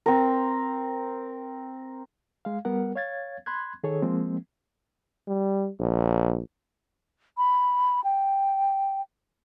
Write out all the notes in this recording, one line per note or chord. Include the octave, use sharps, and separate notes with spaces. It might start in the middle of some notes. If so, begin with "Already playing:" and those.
C4 A#4
G#3 F5
G3 B3 A#4 F#5
C#5 F5 G#6 A6
B5 C6 F#6 G#6
D#3 G#4 A4 C#5
F3 G#3 A#3 C4
G3
A#1
B5
G5